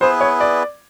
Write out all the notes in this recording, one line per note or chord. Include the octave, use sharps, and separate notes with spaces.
B3 E4 G#4 B4 C5
C#5
D5